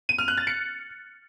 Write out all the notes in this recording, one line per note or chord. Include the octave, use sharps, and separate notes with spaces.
D#7
F6
F#6
A6
C#7